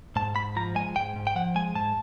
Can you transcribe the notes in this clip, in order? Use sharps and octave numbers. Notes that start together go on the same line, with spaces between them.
G#2 A5
G#2 B5
F3 A#5
G#3 G#5
G#2 G5
G#2
G5
F3 F#5
G#3 G#5
G#2 A5